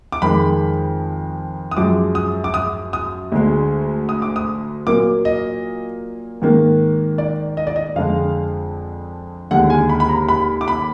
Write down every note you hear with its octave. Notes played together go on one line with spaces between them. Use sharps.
D6
F2 D#3 G#3 B5
D#6
F#2 F3 G#3 D6
D#6
D6
D#6
D#6
D2 D3 G#3
D#6
D6
D#6
A#2 F#3 A#3 D6
D#5
G#2 D#3 A#3
D5
D#5
D5
D#5
F2 D3 G#3 F5
D#2 D3 G#3 F#5
G#5
B5
B5
A#5
B5
D6
B5